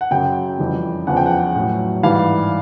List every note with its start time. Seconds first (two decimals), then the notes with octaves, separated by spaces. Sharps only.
0.01 F#5
0.11 F#2 C#3 F#3 G5
0.59 F2 C#3 E3 G3
1.07 E2 C#3 F3 F#5
1.17 G5
1.26 F#5
1.55 A2 F#3
2.03 G#2 E3 G3 F5